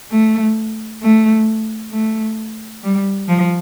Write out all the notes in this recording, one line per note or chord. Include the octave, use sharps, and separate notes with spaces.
A3
A3
A3
G3
F3